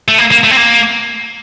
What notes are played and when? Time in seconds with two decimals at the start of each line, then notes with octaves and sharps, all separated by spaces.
0.08 A3
0.18 A#3
0.31 A#3
0.44 A3
0.51 C4
0.57 A#3